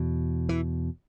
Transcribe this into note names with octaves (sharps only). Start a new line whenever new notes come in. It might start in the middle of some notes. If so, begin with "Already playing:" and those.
Already playing: E2 B2
E3